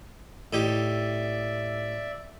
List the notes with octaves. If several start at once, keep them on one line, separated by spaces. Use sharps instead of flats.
A2 D#4 G4 D5 E5